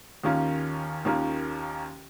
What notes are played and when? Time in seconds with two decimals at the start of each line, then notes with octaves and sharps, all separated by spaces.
0.24 D#2 D#3 A#3 C#4 F4
1.05 D#2 D#3 A#3 C#4 F4